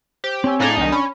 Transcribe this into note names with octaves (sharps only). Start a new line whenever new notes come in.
G4 C5
C4 C#5 G#5 C#6 E6
A2 D4 D#4 G#4 F5 A6 A#6
C2 D#3 D4 G#5 G6
C#4 B5